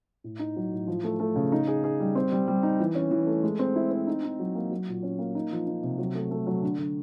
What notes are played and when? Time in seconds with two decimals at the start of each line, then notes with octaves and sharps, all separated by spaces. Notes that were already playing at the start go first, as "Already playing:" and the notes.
0.24 A2
0.39 D#4
0.56 F#3
0.72 A2
0.87 F3
1.04 A3
1.20 A3
1.36 C#3
1.52 D#4
1.67 G#4
1.84 G#4
2.00 G3
2.15 C4
2.32 G3
2.48 G3
2.63 D#4
2.80 E3
2.95 C#4
3.11 E3
3.27 A3
3.43 G#3
3.59 C4
3.76 E4
3.91 C4
4.07 D#4
4.23 D#4
4.39 F#3
4.55 A#3
4.71 F#3
4.88 A#2
5.03 C#4
5.19 A#3
5.35 D#4
5.51 F3
5.67 D#4
5.83 C3
5.98 F#3
6.15 A3
6.31 A3
6.47 F#3
6.62 D3
6.79 D3